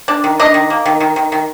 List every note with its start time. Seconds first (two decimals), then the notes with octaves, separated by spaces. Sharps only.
0.08 D4
0.24 D#3
0.40 D4 D#5
0.54 D#3
0.70 A#3
0.86 D#3
1.00 D#3
1.16 D#3
1.32 D#3